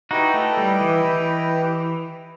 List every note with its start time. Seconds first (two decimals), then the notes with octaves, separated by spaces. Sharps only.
0.11 D#4 E4 F#4 G4 B4 D#5 G5
0.34 A3
0.57 G3
0.81 E3
1.04 E3